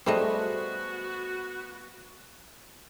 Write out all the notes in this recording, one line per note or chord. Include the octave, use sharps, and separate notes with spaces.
G3 A3 B3 F#4 G#4 C5 D#5